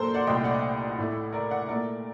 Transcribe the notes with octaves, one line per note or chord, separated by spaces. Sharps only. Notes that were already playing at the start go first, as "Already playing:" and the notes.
Already playing: A#2 F#3 A#3 A4 A#4 C5
D5 F#5
C2 A#2 A3 D#5 G5
D5 F#5
A2 A3
A#4 D5
D5 F#5
A#2 A3 A#4 D5